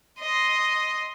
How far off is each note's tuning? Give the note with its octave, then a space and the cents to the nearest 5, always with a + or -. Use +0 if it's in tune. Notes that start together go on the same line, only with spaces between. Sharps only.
D#5 +0 C6 +0